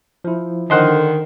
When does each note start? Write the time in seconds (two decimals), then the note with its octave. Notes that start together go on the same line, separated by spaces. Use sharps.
0.24 F3 E4
0.70 D3 D#3 D#4 C5 F#5